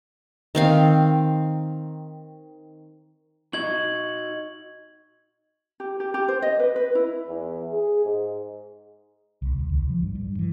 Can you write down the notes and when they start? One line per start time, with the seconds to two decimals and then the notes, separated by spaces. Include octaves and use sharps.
0.55 D#3 C4 F5
3.53 D#4 F#4 D#5 G#6 F#7
5.80 G4
6.00 G4
6.14 G4
6.28 C5
6.42 D#5
6.59 B4
6.76 B4
6.95 E4
7.28 E2
7.71 G#4
8.04 G#2
9.42 C2
9.59 D2
9.73 C2
9.90 F3
10.03 G2
10.15 G2
10.39 E3